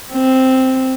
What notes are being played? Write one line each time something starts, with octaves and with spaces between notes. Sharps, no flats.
C4